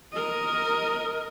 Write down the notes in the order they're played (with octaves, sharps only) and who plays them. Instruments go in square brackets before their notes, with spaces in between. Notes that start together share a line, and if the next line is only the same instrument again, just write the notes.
[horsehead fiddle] A#4 D#5